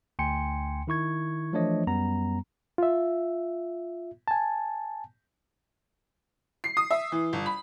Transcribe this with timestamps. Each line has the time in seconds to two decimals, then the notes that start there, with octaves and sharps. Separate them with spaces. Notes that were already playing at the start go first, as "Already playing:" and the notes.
0.19 D2 G5 G#5 C6 C#7
0.87 D#3 E4 C#6 G#6
1.53 E3 F3 A3 D4 C#5 D#5
1.87 F#2 G3 B3 A#5
2.78 F4 E5
4.28 G#5 A5
6.64 C7
6.77 D#6
6.91 E5
7.12 E3
7.33 G1
7.46 B5